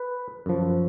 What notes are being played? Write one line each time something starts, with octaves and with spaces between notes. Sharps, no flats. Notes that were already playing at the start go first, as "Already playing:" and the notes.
Already playing: B4
F#2 F3